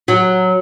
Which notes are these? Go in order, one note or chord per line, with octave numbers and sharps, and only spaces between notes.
F#3